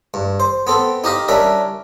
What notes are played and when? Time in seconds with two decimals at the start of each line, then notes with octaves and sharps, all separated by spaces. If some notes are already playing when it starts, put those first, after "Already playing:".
0.14 G2
0.40 C5
0.67 B3 C4 A4
1.04 D#4 G4 D#5 F5
1.28 G3 C#4 D4 A#4 E5